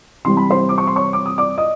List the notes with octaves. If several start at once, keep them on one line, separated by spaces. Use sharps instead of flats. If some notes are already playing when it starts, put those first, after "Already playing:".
C3 E3 G3 C4 C6
B5
C5 C6
D6
C#6
C6
C#5 C#6
D6
D#6
D5 D6
D#5 D#6